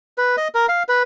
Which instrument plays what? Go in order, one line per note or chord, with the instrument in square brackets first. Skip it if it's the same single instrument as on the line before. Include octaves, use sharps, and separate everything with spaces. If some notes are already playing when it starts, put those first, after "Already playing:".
[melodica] B4
D#5
A#4
F5
B4